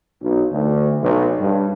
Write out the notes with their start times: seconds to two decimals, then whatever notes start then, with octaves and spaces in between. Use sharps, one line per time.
0.22 B1
0.51 D2
1.02 B1
1.40 G2